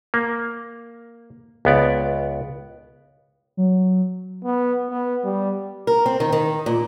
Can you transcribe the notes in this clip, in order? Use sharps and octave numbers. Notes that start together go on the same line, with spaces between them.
A#3
C#2 B3 D5
F#3
B3
B3
G3
A#4
C4
D#3
D#3
A#2